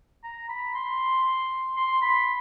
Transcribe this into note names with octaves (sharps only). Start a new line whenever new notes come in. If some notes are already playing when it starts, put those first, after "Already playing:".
A#5
B5
C6
C6
B5